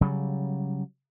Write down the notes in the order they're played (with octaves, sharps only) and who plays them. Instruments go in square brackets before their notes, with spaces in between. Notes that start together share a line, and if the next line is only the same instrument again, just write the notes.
[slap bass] C#3 F#3 G3